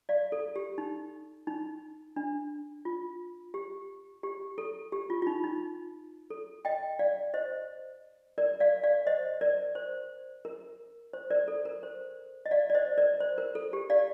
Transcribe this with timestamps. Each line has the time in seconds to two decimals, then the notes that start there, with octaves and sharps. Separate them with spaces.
0.09 D5 F5
0.32 A4
0.56 G4
0.78 D#4
1.47 D#4
2.16 D4
2.85 F4
3.54 G4
4.23 G4
4.58 A4
4.92 G4
5.10 F4
5.22 F4
5.27 D#4
5.44 D#4
6.30 A4
6.65 D#5 G5
6.99 D5 F5
7.34 C5 D#5
8.38 A#4 D5
8.60 D5 F5
8.83 D5 F5
9.07 C5 D#5
9.41 A#4 D5
9.75 C5
10.45 A#4
11.13 C5
11.30 A#4 D5
11.48 A4
11.65 A#4
11.83 C5
12.46 D#5
12.51 D5 F5
12.70 D5
12.75 C5 D#5
12.98 A#4 D5
13.21 C5
13.38 A#4
13.55 A4
13.73 G4
13.90 D5 F5